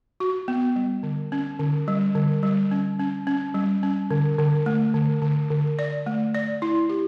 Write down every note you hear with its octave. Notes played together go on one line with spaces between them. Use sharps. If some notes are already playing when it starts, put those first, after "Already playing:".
F#4
B3
G3
D3
C#4
D3
G3
D3
G3
C#4
C#4
C#4
G3
C#4
D3
D3
A3
D3
D3
D3
D5
A3
D5
E4
G4